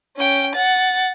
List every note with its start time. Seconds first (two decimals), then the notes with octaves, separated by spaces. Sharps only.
0.17 C#4 G5
0.55 F#5 A6